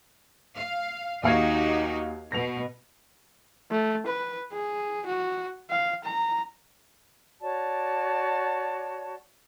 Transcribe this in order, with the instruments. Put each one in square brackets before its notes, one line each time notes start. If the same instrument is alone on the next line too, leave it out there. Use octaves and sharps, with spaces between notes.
[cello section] F5
[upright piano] D#2 F5 G#6 [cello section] D#4 F#4 G4
[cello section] B2 [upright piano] A#6 F7
[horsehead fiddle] A3
B4
G#4
F#4
F5
A#5
[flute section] F#4 C#5 D5 A5